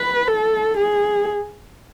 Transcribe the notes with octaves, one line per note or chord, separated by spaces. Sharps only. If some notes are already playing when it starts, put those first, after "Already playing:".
Already playing: B4
A4
G#4